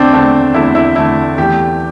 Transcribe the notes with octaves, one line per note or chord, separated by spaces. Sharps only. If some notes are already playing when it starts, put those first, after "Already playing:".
Already playing: E2 D3 A3 C4 D4
E2 D3 A3 D4
E2 D3 A3 E4
E4
E2 D3 A3 E4
E2 E3 A3 G4